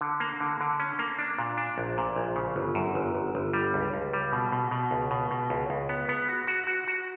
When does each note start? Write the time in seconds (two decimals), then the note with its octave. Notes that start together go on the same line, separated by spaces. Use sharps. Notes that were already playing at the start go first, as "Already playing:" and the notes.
0.01 D3
0.20 A#3
0.41 D3
0.61 D3
0.80 C#4
0.99 A#3
1.19 D4
1.39 A#2
1.58 D4
1.78 A#1
1.98 A#2
2.16 A#1
2.36 C#3
2.56 G1
2.75 F#2
2.95 G1
3.15 G1
3.35 G1
3.53 G3
3.74 C#2
3.94 C#2
4.13 G3
4.33 B2
4.52 B2
4.71 B2
4.91 C#2
5.11 B2
5.31 B2
5.50 C#2
5.70 C#2
5.89 B3
6.09 B3
6.28 F#4
6.47 F#4
6.67 F#4
6.88 F#4